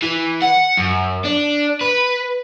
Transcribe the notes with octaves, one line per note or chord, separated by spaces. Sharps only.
E3
F#5
F#2
D4
B4